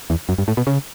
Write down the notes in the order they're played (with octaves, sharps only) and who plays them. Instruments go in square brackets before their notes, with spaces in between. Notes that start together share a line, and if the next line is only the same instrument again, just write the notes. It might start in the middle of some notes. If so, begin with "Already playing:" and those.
[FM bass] E2
F#2
G2
A2
B2
C#3